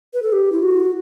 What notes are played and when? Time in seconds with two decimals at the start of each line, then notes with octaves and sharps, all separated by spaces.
0.14 B4
0.23 A4
0.32 G4
0.52 E4
0.62 F#4